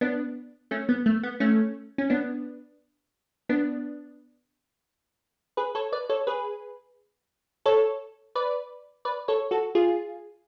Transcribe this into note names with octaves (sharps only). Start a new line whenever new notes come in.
B3 D4
A3 C#4
B3
A3
B3
A3 C#4
C#4
B3 D4
B3 D4
G#4 B4
A4 C#5
B4 D5
A4 C#5
G#4 B4
A4 C#5
B4 D5
B4 D5
A4 C#5
F#4 A4
F4 G#4